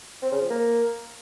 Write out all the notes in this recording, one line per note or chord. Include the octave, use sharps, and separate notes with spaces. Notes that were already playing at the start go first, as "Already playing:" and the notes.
C4
C#3
F3
A#3